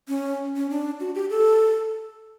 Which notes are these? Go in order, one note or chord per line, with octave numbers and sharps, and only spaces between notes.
C#4
C#4
D4
F#4
G4
A4